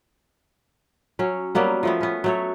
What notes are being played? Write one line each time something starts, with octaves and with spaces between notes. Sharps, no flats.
F#3 C#4
F#3 G3 A#3 B3
F3 A3 B3
B3 C#4
F#3 A3 C#5